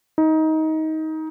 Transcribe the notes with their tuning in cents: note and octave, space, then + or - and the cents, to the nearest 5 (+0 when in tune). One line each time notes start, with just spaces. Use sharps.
D#4 +20